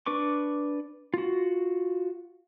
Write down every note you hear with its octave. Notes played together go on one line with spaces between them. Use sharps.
D4 B4 C#6 D6
F4 F#4